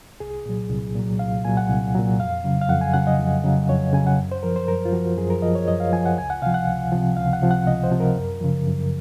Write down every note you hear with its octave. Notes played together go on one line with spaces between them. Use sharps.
C2 G#4
A#2 F#3
C2
A#2 F#3
C2 F5
A#2 F#3 G#5
F#5
C2
A#2 F#3
F2 F5
C#3 F#3
F5
F2 F#5
G#5
C#3 F#3 F#5
D#5
F2
C#3 F#3
F2 C#5
C#3 F#3 G#5
F#5
F#2
C5
F3 A#4
C5
F#2 A#4
F4
F3 F#4
F#2 G#4
A#4
F3 D#5
C#5
F#2 D#5
F5
F3 G#5
F#5
C#2 G#5
F#5
C3 F3 F5
F#5
C#2
C3 F3
C#2 F5
F#5
C3 F3
F#5
C#2 D#5
C5
C3 F3
A#4
F#2
C#3 F3
F#2